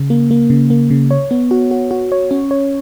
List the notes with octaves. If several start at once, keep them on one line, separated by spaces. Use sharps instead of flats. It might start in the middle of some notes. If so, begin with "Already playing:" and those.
Already playing: C#3
A#3
A#3
C#3
A#3
C#3
C#5
B3
F#4
F#4
F#4
C#5
C#4
C#5